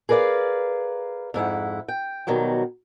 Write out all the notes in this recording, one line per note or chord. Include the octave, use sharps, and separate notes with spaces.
G#4 A#4 B4 D5 F5
F2 G#2 E4 F#5
G5
B2 D#3 F#3 G3